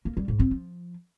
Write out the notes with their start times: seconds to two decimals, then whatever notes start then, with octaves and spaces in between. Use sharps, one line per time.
0.05 A#3
0.17 G3
0.28 G#2
0.39 C4
0.51 F3